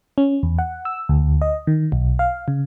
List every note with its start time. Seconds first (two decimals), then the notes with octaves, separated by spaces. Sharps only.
0.18 C#4
0.43 E2
0.59 F#5
0.85 E6
1.09 D2
1.42 D#5
1.67 D#3
1.92 B1
2.19 F5
2.48 C#3